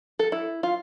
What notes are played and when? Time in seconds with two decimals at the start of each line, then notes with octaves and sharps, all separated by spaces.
0.19 A4
0.32 E4
0.63 F4